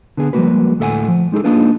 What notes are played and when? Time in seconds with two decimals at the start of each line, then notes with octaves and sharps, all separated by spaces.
0.17 D3 B3 G#4
0.33 F3 G3 G#3 A#3 F#4 B4
0.79 D2 A2 A4 E5 F#5 G#5
1.08 F3
1.32 G#3 D#4 G#4 A4
1.44 A#3 D4 D#4 F4 G#4 B4